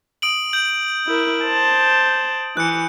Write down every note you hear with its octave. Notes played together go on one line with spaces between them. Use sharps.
D#6 D7 F#7
G6 F#7
E4 A#4
C5 A5
E3 F#6 C#7